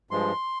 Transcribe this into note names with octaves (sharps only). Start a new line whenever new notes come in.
G2 F3 G#3 C6